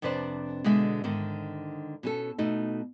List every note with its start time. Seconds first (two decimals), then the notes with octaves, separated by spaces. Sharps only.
0.02 F2 C3 D4 B4 C5 D5
0.64 B2 D3 G#3 E5
1.04 G#2 D3 D#3
2.03 B2 C#4 A4
2.38 B2 A3 D#4